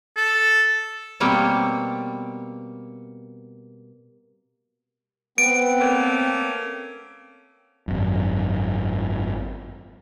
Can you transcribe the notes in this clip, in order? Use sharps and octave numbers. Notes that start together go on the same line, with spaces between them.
A4
B2 G3 A#3 C4 C#5
B3 C4 D7
A3 A#3 C#4
G#1 F#2